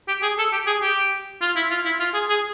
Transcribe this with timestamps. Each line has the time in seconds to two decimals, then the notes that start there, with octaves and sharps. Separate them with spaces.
0.08 G4
0.22 G#4
0.38 A4
0.53 G4
0.67 G#4
0.82 G4
1.41 F4
1.56 E4
1.71 F4
1.85 E4
2.00 F4
2.14 G#4
2.29 G#4